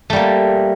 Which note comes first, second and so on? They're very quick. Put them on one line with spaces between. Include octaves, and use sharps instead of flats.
A3 G3 A#3